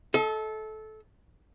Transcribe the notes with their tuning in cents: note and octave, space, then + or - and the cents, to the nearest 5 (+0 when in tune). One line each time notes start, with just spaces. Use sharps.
A4 -20 D#5 +40